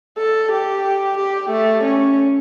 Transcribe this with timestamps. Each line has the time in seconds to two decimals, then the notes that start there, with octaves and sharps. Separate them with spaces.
0.18 A4
0.52 G4
1.18 G4
1.50 A3
1.84 C#4